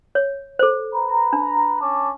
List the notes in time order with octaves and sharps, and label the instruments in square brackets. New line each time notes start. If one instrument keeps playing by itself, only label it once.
[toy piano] C#5
A4 C5
[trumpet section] B4 A#5
[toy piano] D4
[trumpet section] C#4 A5 D6